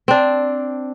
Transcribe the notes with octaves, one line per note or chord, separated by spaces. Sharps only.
C4 D4